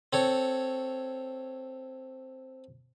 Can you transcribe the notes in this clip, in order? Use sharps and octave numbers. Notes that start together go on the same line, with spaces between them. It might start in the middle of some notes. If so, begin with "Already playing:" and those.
C4 A4 C#5